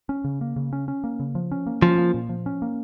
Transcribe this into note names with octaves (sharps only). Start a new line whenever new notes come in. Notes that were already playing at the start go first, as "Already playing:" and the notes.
C#4
C#3
A#3
C#3
C#4
C#4
A#3
C#3
F3
C#4
A#3
F3 C#4
A#3
A#2
F3
C#4
A#3